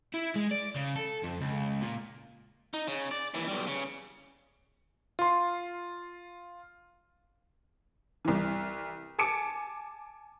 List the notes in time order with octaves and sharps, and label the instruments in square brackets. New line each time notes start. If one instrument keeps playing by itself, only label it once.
[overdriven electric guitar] E4
G#3
D5
C#3
A4
F2
C#2
A#2
[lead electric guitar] D#4
C#3
D5
D#2 E3
B1 G3
C#3
[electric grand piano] F4 C6
[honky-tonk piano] C2 E3
G#5 A5 D6 C#7 D7